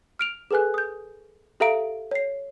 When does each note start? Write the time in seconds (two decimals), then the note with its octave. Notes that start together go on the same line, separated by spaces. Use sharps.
0.19 F6 D7 F7
0.51 G#4 A4 B4 G#5 F#6
0.74 D#6 G6
1.60 G4 A4 E5 F5 A#5 D7
2.11 C#5 C7